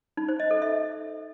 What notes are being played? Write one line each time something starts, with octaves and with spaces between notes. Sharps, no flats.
D#4
C5
D#5
A4
E5